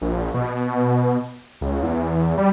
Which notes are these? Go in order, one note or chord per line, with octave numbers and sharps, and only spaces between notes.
A#1
B2
C#2
E2
G3